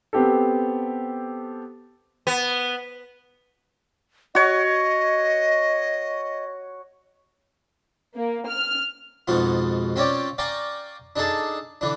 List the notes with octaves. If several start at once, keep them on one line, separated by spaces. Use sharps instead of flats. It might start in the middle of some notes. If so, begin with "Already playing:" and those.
B3 C4 G4 A4
B3
F#4 C#5 D#5
A#3
F6
F2 G#2 B2 F4
C4 C#4 F4 C#5 D5 G5
D5 F5 G5 G#5 A#5 C#6
D4 D#4 G#4 A4 A5
D3 E3 D4